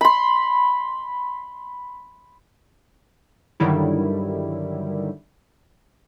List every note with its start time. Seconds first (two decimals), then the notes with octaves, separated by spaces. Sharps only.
0.01 B5 C6
3.60 G2 D3 D#3 F#3 G3 E4